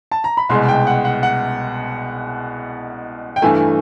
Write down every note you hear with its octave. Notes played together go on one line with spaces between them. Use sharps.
A5
A#5
B5
C2 B2 G#3 C6
G5
F#5
F#5
F#5
G5
G2 E3 A3 G#5